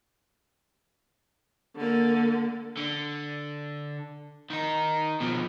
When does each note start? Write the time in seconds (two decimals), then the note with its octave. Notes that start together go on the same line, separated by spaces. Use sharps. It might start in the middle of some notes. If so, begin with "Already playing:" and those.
1.76 D3 A#3
2.77 D3
4.50 D#3 D#4
5.20 B2 F3